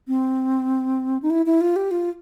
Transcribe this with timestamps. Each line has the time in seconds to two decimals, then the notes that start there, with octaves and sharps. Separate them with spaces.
0.08 C4
1.22 D#4
1.30 E4
1.46 E4
1.61 F4
1.76 G4
1.91 F4